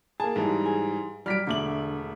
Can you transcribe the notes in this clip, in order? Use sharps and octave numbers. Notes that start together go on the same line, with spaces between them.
A#3 G#4 A5
G#2 E3 G3
G#4
F#3 G3 F6 B6 D7
E1 D3 A3 F#7